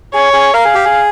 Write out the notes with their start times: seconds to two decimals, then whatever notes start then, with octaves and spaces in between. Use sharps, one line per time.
0.14 G#4 C#5
0.33 G#4
0.54 A#4 F5
0.65 G#4
0.75 G4
0.85 G#4